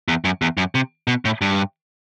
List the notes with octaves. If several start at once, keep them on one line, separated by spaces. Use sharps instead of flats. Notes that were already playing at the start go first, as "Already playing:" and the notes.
E2
F#2
E2
F#2
C3
B2
A2
G2